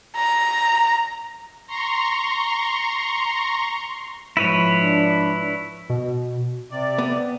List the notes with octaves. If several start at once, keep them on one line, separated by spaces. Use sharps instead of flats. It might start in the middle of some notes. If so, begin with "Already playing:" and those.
A#5
A#5 C6 C#6
G#2 F3 E4 B4 C#5
D4
B2
C3 D5
B3